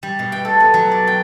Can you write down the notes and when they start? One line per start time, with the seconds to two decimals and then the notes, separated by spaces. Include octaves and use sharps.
0.03 G3
0.19 B2
0.32 G5
0.45 A4
0.60 B3
0.74 F#3
0.91 D5
1.07 G5